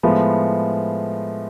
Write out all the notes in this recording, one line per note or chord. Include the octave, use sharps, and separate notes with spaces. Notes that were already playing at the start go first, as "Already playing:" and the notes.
A2 F3 G#3 B3